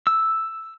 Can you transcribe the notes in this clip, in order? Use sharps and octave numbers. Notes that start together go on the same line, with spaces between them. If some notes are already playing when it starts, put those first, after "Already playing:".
E6